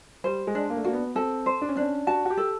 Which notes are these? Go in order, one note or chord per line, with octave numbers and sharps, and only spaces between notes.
G3 C5
G#3
D4
A#3
A3
A#3 F#4
B3
C4 A4
C5
D4
C#4
C4 D4
C#4
F#4 A5
F#4
G4
A4